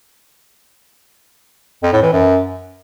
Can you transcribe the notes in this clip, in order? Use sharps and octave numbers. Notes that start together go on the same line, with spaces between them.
F2
A2
E3
F#2